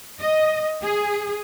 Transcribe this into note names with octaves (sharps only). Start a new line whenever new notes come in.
D#5
G#4